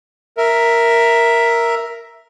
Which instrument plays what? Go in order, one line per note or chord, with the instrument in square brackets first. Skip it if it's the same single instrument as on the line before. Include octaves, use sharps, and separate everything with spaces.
[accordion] A#4 E5